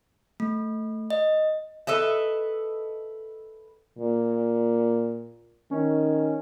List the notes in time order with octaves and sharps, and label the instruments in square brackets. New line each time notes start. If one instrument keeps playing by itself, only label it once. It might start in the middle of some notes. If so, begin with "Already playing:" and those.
[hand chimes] A3
D#5
[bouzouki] A4 B4 D#5 E5
[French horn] A#2
[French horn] D#3 [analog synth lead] C#4